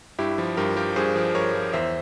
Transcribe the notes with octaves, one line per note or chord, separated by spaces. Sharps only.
G2 E4 G4
F3
G2 G4 A#4
F3 G4 A#4
G2 G#4 C5
F3
G2 A#4 C#5
F3
E2 C5 E5